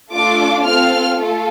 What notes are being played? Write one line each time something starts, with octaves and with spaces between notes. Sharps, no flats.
A3 D4 F4 A4 D6
C4 F4 A4 F6
A3 F4 A4